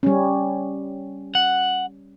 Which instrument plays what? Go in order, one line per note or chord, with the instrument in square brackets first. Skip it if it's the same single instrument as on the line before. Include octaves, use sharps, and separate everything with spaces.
[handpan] G3 C#4
[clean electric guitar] F#5